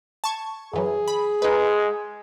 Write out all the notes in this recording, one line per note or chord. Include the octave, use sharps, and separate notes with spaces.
A5 C#6 G#6
F#2 E3 F#3 G#4
B5
G#3 D#4 B4